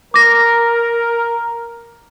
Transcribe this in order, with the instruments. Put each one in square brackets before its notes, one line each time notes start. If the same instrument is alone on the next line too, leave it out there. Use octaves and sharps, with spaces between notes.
[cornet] A#4 [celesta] D6 A#6